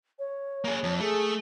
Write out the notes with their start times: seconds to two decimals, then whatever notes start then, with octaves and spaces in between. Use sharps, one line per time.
0.19 C#5
0.65 A#3 G#4
0.83 F2
1.00 A3 G#4